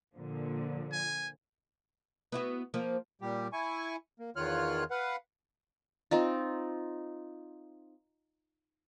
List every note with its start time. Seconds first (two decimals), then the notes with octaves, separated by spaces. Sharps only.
0.13 A#2 D3 F3
0.92 G#5
2.32 B3 E4 F#4
2.74 F3 A#3
3.21 A#2 G3 G4
3.53 E4 G#5 C#6
4.20 A#3
4.36 E2 D#3 F4 C#5 F6 F#6
4.91 B4 F5 F#5
6.11 C4 D#4 F4